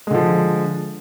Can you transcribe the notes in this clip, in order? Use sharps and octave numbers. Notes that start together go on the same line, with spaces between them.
D3 F3 G#3